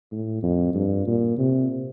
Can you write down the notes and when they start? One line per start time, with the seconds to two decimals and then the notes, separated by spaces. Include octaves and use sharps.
0.12 A2
0.43 F2
0.75 G2
1.07 A#2
1.38 C3